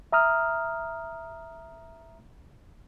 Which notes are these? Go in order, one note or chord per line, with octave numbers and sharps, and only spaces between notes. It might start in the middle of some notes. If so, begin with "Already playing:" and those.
E5 A#5 D#6 F6